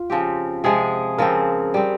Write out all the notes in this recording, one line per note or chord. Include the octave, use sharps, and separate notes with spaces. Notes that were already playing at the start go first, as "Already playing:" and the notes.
Already playing: F4
C#3 F3 C4 G4
C3 F3 G#3 G#4
C#3 F3 C4 A#4
G3 C4